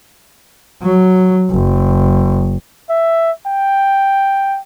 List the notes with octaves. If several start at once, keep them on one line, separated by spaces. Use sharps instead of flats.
F#3
F#1
E5
G5